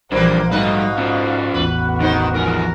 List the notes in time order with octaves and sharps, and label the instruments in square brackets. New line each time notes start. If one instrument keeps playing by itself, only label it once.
[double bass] A#1 E3 [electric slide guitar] F3 G3 D4 [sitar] A#3 B4 [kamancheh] C5
[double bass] G#2 [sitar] B2 D#4 B4 [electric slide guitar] G3 A3 [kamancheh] F#4 F5
[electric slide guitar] C#4 F4 C5
[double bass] A1 E2 [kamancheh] F#4 [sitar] B4
[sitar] C3 D#4 C5 [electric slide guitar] D#3
[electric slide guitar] D#3 F3 [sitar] G#3 A#4